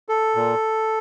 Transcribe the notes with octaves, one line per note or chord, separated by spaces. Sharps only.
A4
A#2